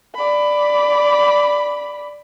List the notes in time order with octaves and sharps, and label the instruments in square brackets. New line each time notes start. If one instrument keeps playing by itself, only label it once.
[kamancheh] D5 B5